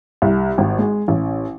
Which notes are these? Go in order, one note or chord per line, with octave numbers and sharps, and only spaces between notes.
C2
G#1
G#3
A1